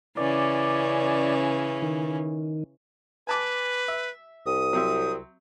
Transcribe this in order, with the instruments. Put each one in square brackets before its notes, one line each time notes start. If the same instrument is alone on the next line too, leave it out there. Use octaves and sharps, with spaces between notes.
[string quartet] C#3 E3 C#4 [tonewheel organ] D5
[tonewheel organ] D#3
[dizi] B4 [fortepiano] G#5 A5 D6
[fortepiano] E5
[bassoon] C2 [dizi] D#6
[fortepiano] F#3 C4 E5